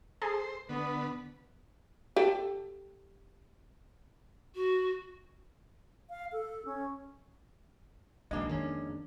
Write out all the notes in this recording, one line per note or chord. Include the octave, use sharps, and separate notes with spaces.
G#4 A4 C5
D3 B3 B4
G4 A4 G5
F#4
F5
A4
C#4
A#1 E2 D#3 F#3 G#3 A#3 D4 D#5
F2 D#3 C#4